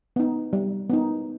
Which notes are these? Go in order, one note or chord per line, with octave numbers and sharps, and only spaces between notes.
B3 D#4
G3
B3 D#4